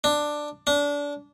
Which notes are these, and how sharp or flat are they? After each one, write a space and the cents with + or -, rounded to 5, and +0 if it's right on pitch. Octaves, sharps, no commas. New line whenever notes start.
D4 +10
D4 -25